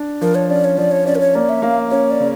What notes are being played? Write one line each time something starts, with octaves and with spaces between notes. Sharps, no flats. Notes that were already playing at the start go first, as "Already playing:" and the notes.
Already playing: D4
F3 A#4
C#5
C#4 D5
C#5
F3 D5
C#5
C#4 D5
A#4
C#5
A#3 D5
E5
A#3 F5
C#4 C#5
D5
C#3